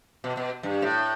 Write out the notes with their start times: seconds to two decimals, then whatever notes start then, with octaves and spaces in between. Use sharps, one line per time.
0.24 B2
0.37 B2
0.63 G2
0.82 A2